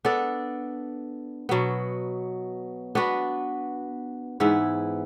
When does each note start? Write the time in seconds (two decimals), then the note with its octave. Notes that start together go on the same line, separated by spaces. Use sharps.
0.05 B3 D4 A4 D5
1.49 B2 F#3 B3
2.95 B3 D4 F#4 B4
4.40 G#2 E3 B3 E4